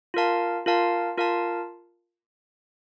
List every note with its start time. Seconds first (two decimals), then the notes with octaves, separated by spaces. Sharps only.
0.14 F4 A#4 F5 A5
0.66 F4 A#4 F5 A5
1.18 F4 A#4 F5 A5